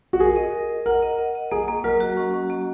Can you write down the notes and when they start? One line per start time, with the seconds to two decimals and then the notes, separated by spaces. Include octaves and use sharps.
0.13 F#4
0.20 G#4 A#4
0.36 D#5
0.53 A#4
0.69 D#5
0.86 A#4 F#5
1.02 D#5
1.19 D#5
1.35 D#5
1.51 A#3 G#4
1.68 A#3
1.84 F#3 A#4
2.00 F#4
2.17 C#4
2.34 C#4
2.50 A#3